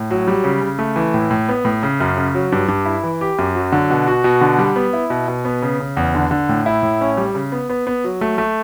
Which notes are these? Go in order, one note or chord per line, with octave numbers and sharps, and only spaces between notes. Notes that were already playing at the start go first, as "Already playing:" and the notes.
Already playing: A2
F#3
G3
C#3
C#3
A3
E3
A2
A2
B3
A2
C#3
F#2
C#3
F#3
G2
G2
E4
E3
G4
F#2
F#3
D3
B2
F#4
B2
D3
G3
B3
E4
B2
B2
B3
C#3
C#3
E2
D3
D3
A2
E4
A2
C#4
G3
C#3
B3
B3
B3
F#3
A3
A3